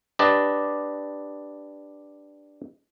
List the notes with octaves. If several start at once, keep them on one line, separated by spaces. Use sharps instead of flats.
D4 G4 B4 D5 D#5